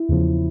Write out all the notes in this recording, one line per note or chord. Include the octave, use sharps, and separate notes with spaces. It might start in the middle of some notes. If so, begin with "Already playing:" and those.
Already playing: E4
E2 C#3 F3